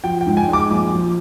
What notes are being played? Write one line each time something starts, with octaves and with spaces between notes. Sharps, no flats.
F3 G5
G5
G#2
G#5
G#3 D6
A#1
F3